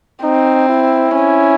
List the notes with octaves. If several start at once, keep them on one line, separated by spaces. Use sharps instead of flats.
C4 D#4
E4
C#4